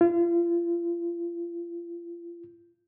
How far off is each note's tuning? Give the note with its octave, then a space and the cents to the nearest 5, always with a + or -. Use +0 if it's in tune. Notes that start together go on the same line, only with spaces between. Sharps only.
F4 -35